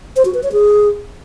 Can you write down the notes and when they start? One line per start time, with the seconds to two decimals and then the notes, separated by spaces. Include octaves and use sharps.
0.16 C5
0.25 F#4
0.34 B4
0.43 C#5
0.52 G#4